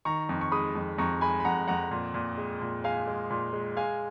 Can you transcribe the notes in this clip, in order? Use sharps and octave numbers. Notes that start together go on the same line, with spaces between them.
D#3 A#5 C#6
F2
C#6
G#3 B5 D#6
F2
F2 A#5 C#6
G#3 G#5 B5
B5
F2 F#5 A#5
F2 F#5 A#5
A#2
A#2
G#3
A#2
G#3 F5 G#5
G#3
A#2
G#3
G#3 F5 G#5